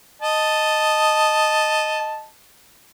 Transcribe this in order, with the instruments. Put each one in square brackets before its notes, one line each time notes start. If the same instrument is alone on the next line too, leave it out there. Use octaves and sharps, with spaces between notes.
[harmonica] D#5 A5